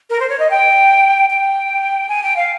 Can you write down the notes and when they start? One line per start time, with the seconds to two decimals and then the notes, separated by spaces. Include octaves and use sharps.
0.09 A#4
0.20 C5
0.29 C#5
0.39 D#5
0.49 G5
1.29 G5
2.08 G#5
2.23 G5
2.36 F5